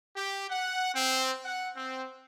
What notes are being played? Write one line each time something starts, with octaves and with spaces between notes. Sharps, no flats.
G4
F#5
C4
F#5
C4